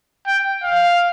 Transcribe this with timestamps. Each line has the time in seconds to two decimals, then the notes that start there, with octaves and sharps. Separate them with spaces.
0.27 G5
0.64 F5